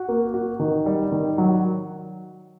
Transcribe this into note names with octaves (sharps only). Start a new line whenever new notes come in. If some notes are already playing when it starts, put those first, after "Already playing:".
Already playing: F#4
A#3
F#4
D#3
G3
D#3
F#3